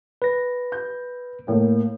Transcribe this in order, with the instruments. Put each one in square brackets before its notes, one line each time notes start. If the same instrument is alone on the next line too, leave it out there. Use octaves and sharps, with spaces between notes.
[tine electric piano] B4 A#6
[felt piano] G6
[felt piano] A2 [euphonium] A#3